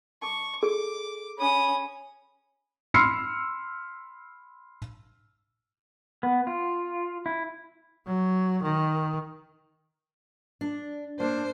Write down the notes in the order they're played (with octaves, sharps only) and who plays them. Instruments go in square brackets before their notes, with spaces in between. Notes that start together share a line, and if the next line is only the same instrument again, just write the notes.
[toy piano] A5 D6 [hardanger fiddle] C#6
[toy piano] G#4 A4 [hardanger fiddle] D6
[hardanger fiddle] C#4 D#6 [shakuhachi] B5
[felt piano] B5 C6 E6 F6 C7 C#7
[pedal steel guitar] B3
F4
E4
[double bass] F#3
D#3
[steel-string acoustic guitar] D4
[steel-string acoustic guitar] A#3 [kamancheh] D4 [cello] C5